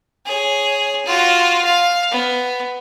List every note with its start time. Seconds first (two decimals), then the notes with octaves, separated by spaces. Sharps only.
0.26 G#4 C#5
1.05 F4 F#4
1.64 F5
2.11 B3